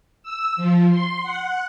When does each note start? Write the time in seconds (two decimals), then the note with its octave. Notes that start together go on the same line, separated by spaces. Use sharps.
0.23 E6
0.57 F3
0.90 C6
1.22 F#5